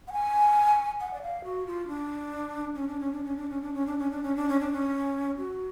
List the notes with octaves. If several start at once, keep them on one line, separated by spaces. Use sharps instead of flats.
F#5
G#5
F#5
D5
F5
F#4
F4
D4
C#4
D4
C#4
D4
C#4
D4
C#4
D4
C#4
D4
C#4
D4
C#4
D4
C#4
D4
C#4
F#4